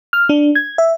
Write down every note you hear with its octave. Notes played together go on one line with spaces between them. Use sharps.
F6
D4
G#6
E5